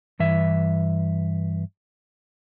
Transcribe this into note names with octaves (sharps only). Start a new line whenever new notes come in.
G2 E3 E5